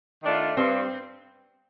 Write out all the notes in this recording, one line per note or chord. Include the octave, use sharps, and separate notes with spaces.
D#3 A3 D4 F4
G2 C4